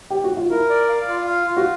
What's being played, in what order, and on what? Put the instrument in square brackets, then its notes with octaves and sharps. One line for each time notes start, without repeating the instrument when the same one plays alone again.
[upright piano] G4
F#4
F4
[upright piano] E4 [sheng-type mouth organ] A#4
[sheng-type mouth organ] D5
F5
F4
F5
F4
[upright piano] F#4